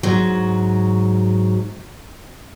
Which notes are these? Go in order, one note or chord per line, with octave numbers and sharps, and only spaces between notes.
G#2 F#3